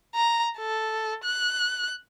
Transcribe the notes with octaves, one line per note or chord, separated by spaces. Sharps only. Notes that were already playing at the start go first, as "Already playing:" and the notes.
A#5
A4
F#6